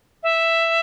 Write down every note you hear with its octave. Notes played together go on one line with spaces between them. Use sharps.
E5